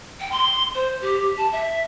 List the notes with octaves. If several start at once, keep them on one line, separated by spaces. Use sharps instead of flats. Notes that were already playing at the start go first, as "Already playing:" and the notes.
G5
C6
C5
G4
A5
E5